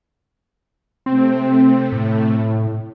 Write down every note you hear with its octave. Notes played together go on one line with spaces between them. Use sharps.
C3 A3 C4
A2